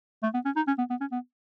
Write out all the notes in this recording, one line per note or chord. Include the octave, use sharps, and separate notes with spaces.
A3
B3
C#4
D#4
C#4
B3
B3
C#4
B3